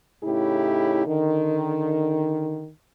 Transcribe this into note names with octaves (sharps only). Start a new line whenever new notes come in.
A2 C#3 D#4 E4 G4
D3 D#3